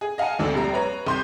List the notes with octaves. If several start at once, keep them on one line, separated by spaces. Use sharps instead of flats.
G#4
D#5 F5 F#5 G#5 A5
D2 C4 D4 A4 C7
F1 A#1 G3 A#5 C7
B4 C#5 A#5
C2 C6 G6